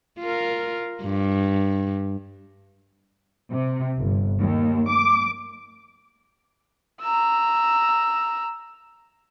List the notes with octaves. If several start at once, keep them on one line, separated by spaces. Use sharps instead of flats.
F4 A#4
G2
C3
G1
D#2
D6
A#5 E6